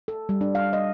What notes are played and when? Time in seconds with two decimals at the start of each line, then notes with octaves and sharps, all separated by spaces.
0.08 A4
0.29 G3
0.41 D4
0.55 F5
0.73 D#5